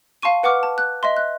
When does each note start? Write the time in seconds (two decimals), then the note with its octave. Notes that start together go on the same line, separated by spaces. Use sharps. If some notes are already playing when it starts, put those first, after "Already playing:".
0.22 F5 A5 C6 C#6 D#7
0.43 B4 F#5 C#6 D6 F6
0.63 A5
0.78 F#6
1.03 D#5 E5 C6
1.17 F#6